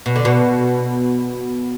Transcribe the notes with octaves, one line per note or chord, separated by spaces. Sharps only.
B2
D3
B2